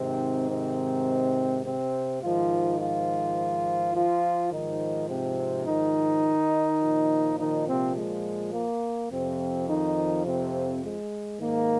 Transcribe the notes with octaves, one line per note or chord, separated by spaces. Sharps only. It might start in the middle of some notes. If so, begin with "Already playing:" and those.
Already playing: G#2 C3 D#3 C4
C3 C4
C3 C4
G#2 D#3 F3 F4
F3 F4
F3 F4
G#2 D#3 F3 D#4
C3 C4
D#3 D#4
A#2 F3
D#3 D#4
C3 C4
G#3
A#3
F2 C3 F3 C4
D#3 D#4
C3 C4
G#3
G#2 D#3 A#3